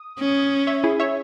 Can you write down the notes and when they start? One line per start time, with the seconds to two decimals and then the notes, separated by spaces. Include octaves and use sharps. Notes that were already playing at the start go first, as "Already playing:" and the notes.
Already playing: D#6
0.19 C#4
0.67 C#5 E5
0.84 E4 G#4
1.00 C#5 E5